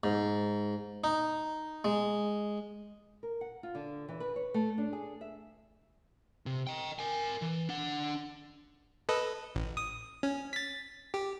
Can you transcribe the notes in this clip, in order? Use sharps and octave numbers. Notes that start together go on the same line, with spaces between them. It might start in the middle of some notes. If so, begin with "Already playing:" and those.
G#2
D#4
G#3
A#4
F#5
F4
D3
E3
B4
C#5
A3
D4
G#4
E5
C3
D#5 G5
A#4 G#5
E3
D4 F#5
A4 B4 D#5
A1
D#6
C#4
A6 B6
G4